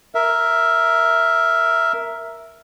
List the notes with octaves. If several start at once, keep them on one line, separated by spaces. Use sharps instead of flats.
A#4 E5